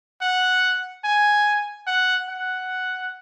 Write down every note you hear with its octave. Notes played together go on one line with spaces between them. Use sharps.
F#5
G#5
F#5
F#5